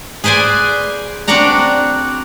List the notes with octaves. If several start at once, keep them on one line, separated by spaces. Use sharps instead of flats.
G#4 B4 C5 D5 G#5
C4 D4 F#4 D5 F#5 A#5